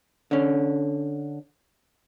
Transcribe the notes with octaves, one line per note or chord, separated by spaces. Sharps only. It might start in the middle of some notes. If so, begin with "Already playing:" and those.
D3 C#4